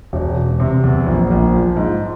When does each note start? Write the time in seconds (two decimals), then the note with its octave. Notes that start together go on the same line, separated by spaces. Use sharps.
0.13 E1
0.37 E1
0.60 C3
0.84 E2
1.06 A#1
1.31 A#1
1.54 F3
1.77 G#2